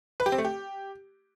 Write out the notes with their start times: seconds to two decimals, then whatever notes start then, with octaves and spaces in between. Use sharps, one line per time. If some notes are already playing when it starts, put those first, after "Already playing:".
0.20 B4
0.26 G4
0.32 C4
0.38 A3
0.45 G4